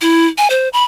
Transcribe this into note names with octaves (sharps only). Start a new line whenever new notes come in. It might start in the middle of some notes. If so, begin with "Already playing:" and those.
E4
G#5
C5
B5